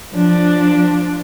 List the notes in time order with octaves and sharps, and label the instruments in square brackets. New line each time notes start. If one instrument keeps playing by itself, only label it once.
[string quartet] F3 D4